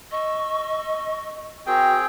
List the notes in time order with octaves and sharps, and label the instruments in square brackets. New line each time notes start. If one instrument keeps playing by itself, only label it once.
[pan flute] D#5 [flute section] C#6 E6
[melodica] C4 G#4 G5 [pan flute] F#4 [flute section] A#4